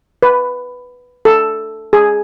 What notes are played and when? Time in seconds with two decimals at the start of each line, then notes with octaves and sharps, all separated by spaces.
0.23 B4
1.25 A4
1.93 G#4